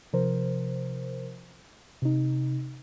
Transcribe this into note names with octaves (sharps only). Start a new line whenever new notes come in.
C3 F3 A#4 C5
C3 D#4